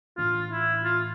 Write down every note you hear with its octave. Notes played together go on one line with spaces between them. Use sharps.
A2 E3 A3 D4 F4
E4
F4